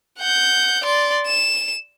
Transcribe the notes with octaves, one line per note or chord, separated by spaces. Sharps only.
F#5 G6
D5 C6
E7